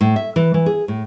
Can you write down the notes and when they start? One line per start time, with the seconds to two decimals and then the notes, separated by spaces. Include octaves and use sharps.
0.01 A2
0.16 E5
0.36 E3
0.54 E3
0.66 G#4
0.88 A2